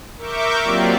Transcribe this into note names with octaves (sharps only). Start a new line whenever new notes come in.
A#4 E5 C#6 D6 G6
F#3 A#3 C4 F4 G4 D5